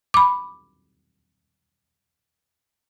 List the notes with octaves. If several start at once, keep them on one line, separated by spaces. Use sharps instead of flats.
B5 D6